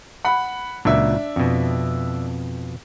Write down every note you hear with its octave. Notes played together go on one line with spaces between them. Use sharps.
F#5 B5
C#2 A#2 F#3 D4 E5
F2 B2